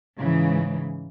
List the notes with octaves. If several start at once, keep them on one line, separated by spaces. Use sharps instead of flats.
G#2 C#3 E3